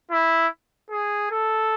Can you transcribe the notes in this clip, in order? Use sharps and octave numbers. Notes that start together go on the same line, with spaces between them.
E4
G#4
A4